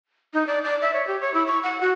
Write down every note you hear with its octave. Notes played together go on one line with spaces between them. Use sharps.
D#4
D5
D5
E5
C#5
G4
C#5
E4
C#6
F#5
F#4